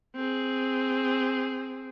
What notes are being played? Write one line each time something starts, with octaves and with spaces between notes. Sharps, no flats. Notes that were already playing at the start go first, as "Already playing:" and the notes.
C4 G#4